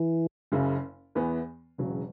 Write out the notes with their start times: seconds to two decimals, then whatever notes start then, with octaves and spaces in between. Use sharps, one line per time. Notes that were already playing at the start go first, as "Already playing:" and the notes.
Already playing: E3
0.52 F#1 F#2 C#3
1.15 E2 E3 B3
1.78 E1 E2 C#3 F#3